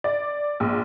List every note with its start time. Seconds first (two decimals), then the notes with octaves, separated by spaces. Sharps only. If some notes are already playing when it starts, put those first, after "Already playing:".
0.04 D5
0.60 A#1